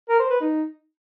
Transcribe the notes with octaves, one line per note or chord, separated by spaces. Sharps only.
A#4
C5
B4
D#4